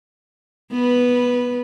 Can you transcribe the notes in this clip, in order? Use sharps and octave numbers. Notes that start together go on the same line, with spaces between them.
B3 B4